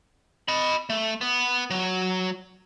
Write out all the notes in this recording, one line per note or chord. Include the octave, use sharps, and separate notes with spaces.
D#5 B5
A3
B3
F#3